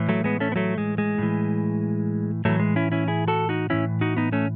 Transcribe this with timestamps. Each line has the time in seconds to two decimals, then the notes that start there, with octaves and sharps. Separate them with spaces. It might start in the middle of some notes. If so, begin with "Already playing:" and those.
Already playing: A2 E3
0.09 F#3 A3
0.24 G#3 B3
0.40 A3 C#4
0.52 B3
0.56 F#3 A3
0.78 G#3
0.98 G#3
1.18 A2 E3
2.45 A2 E3 F#3 A3
2.60 G#3
2.76 C#4 E4
2.92 C#4 E4
3.08 E4 G#4
3.28 F#4 A4
3.49 D#4 F#4
3.70 A2 E3 C#4 E4
4.01 D#4 F#4
4.17 B3 D#4
4.32 A3 C#4